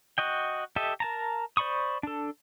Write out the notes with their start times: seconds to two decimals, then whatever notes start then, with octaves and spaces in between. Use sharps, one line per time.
0.18 F#4 D#5 G5
0.76 G4 A4 D#5 E5
1.00 A#4 A5 A#5
1.57 C5 D5 B5 C#6 D#6
2.03 D4 A4